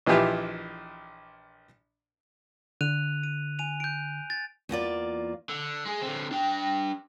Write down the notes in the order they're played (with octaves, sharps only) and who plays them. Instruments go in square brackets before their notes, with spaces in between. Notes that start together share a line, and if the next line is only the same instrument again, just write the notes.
[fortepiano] A#1 E3 D#4 F4 G4 E5
[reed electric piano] D3 [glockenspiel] F#6 D#7 F7
[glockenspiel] D#7
G#5 D#7 F7
G6 D7
A6
[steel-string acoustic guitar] E2 A#3 F4 D5
[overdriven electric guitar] D3
G#3 G#4
D3 C4
D4 G5